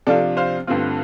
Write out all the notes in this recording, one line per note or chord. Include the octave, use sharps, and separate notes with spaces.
C3 F3 D4 F4 A4 D5
C5 F5
G2 D3 A3 C4 F4